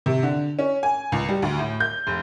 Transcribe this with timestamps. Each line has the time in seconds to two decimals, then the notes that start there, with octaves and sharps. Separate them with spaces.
0.06 C3
0.23 D3
0.59 C#4
0.83 G#5
1.12 C#2
1.29 G3
1.42 D2
1.59 A2
1.80 G6
2.07 F1